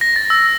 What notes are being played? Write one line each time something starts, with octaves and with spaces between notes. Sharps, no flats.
A#6
A6
E6